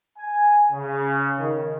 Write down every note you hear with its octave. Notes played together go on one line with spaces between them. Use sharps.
G#5
C#3
D#3